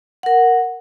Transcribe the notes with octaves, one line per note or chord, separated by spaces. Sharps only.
A#4 F#5